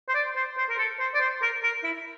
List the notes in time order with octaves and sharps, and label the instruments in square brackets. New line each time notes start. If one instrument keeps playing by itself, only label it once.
[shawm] C5
D5
C5
C5
A#4
A4
C5
D5
C5
A#4
A#4
E4